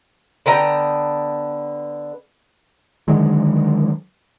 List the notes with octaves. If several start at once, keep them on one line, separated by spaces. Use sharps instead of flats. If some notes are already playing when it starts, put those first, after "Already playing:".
D3 B3 G5 A#5
D3 D#3 F#3 G#3